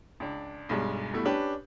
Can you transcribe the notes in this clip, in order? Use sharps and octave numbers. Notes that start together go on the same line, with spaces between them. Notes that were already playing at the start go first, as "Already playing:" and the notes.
C#2 D4
B1 G2 G3 G#3
B2 G3 A3 E4
C#4 D4 G4 B4 B5